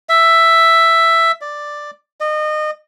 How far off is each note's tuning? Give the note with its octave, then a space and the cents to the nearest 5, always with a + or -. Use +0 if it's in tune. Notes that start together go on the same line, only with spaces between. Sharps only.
E5 +5
D5 +5
D#5 -30